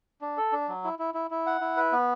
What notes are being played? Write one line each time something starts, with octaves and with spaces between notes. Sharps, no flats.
D4
A4
D4
F#3
E4
E4
E4
E4
F#5
E4
B4
B3